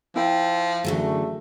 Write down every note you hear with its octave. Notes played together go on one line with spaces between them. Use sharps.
F3 E4 G5
F#2 D3 E3 F#3 A3 G#4